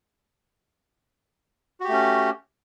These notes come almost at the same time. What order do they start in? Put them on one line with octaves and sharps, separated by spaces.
F#4 G4 A3 C#4